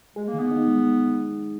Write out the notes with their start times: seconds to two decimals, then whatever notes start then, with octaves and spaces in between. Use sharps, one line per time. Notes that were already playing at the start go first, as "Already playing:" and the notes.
0.16 G#3 G#4
0.28 A#3
0.34 D#3
0.39 B3
0.51 D#4
0.67 G#3